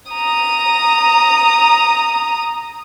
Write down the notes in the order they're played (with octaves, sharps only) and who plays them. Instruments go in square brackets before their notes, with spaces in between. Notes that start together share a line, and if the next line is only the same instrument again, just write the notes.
[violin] A#5 D#6